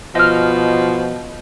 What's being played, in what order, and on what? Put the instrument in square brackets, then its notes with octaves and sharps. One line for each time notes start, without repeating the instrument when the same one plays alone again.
[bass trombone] B2 [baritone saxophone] F3 [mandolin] D#5 F6